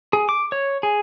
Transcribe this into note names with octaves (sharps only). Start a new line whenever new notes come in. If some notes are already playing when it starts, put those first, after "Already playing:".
G#4
D6
C#5
G#4